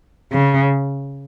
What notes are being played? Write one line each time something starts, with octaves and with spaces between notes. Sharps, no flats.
C#3